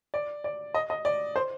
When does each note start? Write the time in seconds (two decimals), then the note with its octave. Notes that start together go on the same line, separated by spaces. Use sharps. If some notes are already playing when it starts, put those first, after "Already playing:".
0.14 D5
0.44 D5
0.74 D#5
0.90 D#5
1.05 D5
1.36 C5